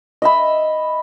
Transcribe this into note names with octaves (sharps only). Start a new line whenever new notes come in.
D#5 E5 B5